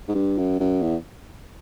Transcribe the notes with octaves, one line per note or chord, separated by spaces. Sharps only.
G#2
G2
F#2
F#2
E2